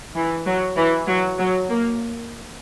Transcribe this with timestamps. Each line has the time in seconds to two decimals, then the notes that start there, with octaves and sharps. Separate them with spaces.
0.16 E3
0.46 F#3
0.77 E3
1.07 F#3
1.39 F#3
1.69 A#3